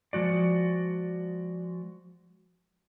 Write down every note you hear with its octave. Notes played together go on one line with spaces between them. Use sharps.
F3 G#3 F#4 D5